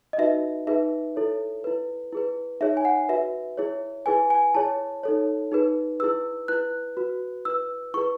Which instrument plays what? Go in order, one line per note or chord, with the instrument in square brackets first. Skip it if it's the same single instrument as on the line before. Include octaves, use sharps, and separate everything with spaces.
[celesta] D#5
D#4 F#4 B4 E5
D#4 G#4 B4 E5
E4 A4 C#5
E4 B4
E4 G#4 B4
D#4 G#4 C#5 E5
G#5
F#5
F#4 B4 E5
E4 G#4 C#5
E4 G#4 B4 G#5
G#5
E4 G#4 C#5 A5
D#4 A4 C#5
D#4 G#4 B4
E4 G#4 B4 E6
E4 B4 F#6
F#4 B4
E4 B4 E6
E4 G#4 B4 C#6